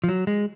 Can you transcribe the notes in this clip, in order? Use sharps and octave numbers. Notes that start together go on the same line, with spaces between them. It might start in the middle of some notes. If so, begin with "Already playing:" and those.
F3
F#3
G#3